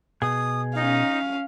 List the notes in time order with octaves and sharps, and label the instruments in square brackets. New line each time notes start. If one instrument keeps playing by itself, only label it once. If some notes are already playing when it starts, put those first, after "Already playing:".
[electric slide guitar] B2 G#4 [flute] D#6
[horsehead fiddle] C#4 F5 [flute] D#4